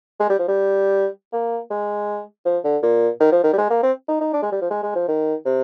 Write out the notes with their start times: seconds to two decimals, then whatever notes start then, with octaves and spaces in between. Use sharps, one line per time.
0.20 G#3
0.30 G3
0.39 F3
0.48 G3
1.33 A#3
1.70 G#3
2.45 F3
2.64 D3
2.83 A#2
3.21 D#3
3.32 F3
3.44 D#3
3.53 G3
3.58 G#3
3.70 A#3
3.83 C4
4.08 D#4
4.21 D#4
4.33 D4
4.42 G#3
4.52 G3
4.61 F3
4.71 G#3
4.83 G#3
4.95 F3
5.08 D#3
5.46 C3